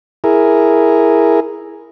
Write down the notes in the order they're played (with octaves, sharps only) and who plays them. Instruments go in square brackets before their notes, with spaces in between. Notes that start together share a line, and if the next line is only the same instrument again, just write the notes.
[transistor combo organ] E4 G#4 A#4